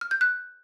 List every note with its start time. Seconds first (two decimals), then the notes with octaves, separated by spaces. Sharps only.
0.01 F6
0.11 G6
0.21 F#6